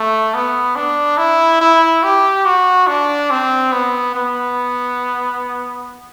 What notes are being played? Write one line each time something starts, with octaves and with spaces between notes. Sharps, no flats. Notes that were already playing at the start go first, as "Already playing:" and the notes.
Already playing: A3
B3
D4
E4
E4
G4
F#4
D4
C4
B3
B3